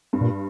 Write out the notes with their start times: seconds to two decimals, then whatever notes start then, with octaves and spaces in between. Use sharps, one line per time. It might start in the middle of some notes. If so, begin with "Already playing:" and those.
0.13 G2
0.21 A#2